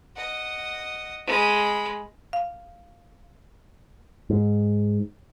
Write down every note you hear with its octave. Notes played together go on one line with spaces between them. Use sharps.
D#5 F#5
G#3 B5
F5
G#2